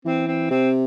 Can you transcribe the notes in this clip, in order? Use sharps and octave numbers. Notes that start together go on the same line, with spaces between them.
E3 C4
C4
C3 C4